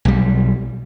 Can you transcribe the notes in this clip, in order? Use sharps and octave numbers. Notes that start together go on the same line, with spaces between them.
B1 G3